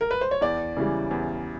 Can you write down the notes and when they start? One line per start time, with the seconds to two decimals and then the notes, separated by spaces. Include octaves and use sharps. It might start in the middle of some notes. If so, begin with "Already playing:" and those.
0.01 A#4
0.11 B4
0.21 C5
0.31 C#5
0.41 E2 D5
0.77 C#3 E3 G3
1.11 E2